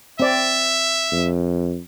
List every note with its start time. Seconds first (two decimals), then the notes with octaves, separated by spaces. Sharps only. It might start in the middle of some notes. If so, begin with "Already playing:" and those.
0.20 C4 D5 E5
1.12 F2